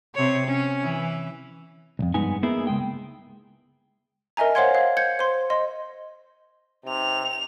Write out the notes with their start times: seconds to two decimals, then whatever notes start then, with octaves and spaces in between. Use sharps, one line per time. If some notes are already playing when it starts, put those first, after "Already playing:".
0.15 C3 C#5
0.47 C#4
0.83 E3
1.99 C2 F2
2.14 G2 G#3 B3 D#4 G#5
2.43 A#3 B3 D#4 E4 G#4 A#4
2.67 C#2 G#2 G#3 G5
4.37 A#4 D#5 E5 G#5 A#5
4.55 C5 C#5 F5 F#5 C6 G#6
4.75 F5
4.97 G6 G#6 C#7
5.19 C5 C6
5.50 D#5 C6
6.87 C3 D#4 F7